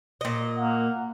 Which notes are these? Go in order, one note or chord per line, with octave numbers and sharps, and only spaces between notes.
A#2 D#5
A#3 F#5